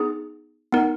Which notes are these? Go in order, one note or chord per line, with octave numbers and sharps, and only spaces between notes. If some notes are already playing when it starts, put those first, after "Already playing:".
Already playing: B3 D#4 G#4
B3 D#4 A#4